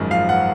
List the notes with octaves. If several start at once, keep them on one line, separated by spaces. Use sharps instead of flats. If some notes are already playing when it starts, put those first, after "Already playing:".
Already playing: G#1 F#2 F3 G#3
F3 F5
F#5